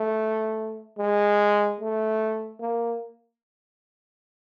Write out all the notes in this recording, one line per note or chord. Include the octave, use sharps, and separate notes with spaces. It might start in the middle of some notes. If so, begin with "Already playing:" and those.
Already playing: A3
G#3
A3
A#3